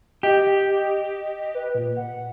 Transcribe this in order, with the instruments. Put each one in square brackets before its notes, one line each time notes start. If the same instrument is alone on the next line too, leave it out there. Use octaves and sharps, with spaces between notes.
[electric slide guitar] G4 [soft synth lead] D#5
[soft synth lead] B4
A#2
F#5